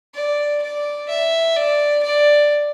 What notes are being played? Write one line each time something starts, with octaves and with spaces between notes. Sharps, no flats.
D5
D5
E5
D5
D5